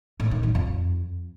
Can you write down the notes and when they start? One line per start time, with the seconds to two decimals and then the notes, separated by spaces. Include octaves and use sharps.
0.20 A2
0.31 D#3
0.43 F#2
0.55 F2